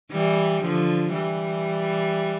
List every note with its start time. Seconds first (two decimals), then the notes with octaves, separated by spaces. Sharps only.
0.11 E3 G3
0.63 D3 F3
1.14 E3 G3